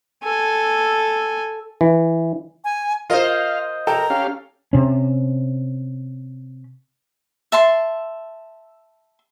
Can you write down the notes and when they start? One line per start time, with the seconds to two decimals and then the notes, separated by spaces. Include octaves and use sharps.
0.24 A4 G#5
1.81 E3
2.64 G#5
3.10 F4 A#4 C5 D#5 F5
3.87 A4 A#4 G5 A5 A#5
4.10 C#4 G4 F5
4.73 C3 C#4
7.52 E5 A5 C6